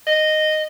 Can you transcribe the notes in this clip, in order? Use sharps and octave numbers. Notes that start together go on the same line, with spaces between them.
D#5